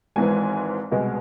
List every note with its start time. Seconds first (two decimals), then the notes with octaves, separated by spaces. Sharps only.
0.16 G#1 G#2 E3 G#5
0.91 C2 B2 G#3